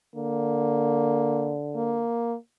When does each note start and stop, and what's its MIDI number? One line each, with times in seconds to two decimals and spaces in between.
0.15 2.08 50
0.15 1.54 58
1.75 2.36 58